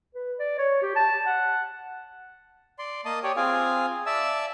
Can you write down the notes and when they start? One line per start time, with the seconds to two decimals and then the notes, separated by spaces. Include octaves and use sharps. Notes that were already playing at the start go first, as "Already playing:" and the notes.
0.15 B4
0.39 D5
0.58 C#5
0.82 G4
0.96 A5
1.26 F#5
2.79 D5 C6
3.05 A#3 D#5 A5 D#6
3.23 G4 C#5 D5
3.36 C4 F4 G#4 F5 G#5
4.06 D5 E5 A5 E6